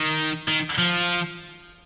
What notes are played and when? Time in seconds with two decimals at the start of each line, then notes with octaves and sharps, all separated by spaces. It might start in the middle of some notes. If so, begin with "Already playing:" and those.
Already playing: D#3
0.48 D#3
0.78 F3